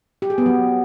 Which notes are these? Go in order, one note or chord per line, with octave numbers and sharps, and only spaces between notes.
G4
G#4
B3
F#3